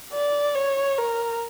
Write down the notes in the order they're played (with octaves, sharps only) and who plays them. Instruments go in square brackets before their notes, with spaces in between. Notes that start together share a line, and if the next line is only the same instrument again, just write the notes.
[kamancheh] D5
C#5
A#4